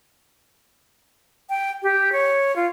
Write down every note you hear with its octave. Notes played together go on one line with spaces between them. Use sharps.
G5
G4
C#5
F4